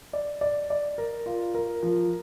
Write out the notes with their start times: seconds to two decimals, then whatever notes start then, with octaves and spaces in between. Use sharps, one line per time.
0.13 D5
0.41 D5
0.70 D5
0.98 A#4
1.26 F4
1.54 A#4
1.83 F3